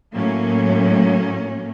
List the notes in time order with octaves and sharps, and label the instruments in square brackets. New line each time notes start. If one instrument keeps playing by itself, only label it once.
[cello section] A2 F#3 A#3 C#4